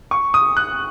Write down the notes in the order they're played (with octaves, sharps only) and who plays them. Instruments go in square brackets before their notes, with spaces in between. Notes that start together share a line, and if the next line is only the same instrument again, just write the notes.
[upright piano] C#6
D#6
F#6